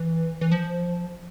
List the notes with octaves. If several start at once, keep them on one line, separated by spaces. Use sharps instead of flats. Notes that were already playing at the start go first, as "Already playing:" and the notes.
Already playing: E3
E3
F3